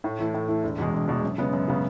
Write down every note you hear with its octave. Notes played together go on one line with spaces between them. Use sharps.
A2
E3 A3 E4
A2
E3 A3 E4
E1
E2 B2 G#3
E1
E2 B2 G#3
F#2
C#3 G#3 B3
F#2
C#3 G#3 B3